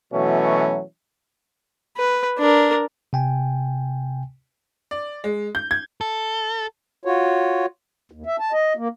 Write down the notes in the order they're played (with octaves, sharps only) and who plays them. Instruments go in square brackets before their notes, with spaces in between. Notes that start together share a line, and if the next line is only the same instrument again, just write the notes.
[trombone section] B2 E3 F#3 A3 C#4
[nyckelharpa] B4
D4 A#4
[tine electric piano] C3 G5 G#5
[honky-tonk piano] D5
G#3
G6
G#6
[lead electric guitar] A4
[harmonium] F4 F#4 C#5
D#2
E5
A5
D#5
A#3